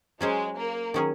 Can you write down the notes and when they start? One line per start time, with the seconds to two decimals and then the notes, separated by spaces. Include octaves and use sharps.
0.21 F#3 G#3 C#4 G#4 C5
0.58 A#3
0.94 D#3 F#3 C#4 G#4